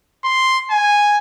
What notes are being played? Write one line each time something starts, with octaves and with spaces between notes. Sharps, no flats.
C6
G#5